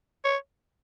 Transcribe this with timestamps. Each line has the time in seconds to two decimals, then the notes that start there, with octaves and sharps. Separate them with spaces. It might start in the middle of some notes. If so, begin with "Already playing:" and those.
0.25 C#5